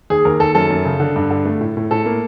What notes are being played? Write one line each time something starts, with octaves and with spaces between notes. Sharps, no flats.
D#2 G#4
D#2 A#4
D#2 A4
F#2 A4
F#2
C#3
D3
G2
D3
A3
A2
A2
A2 A4
A#3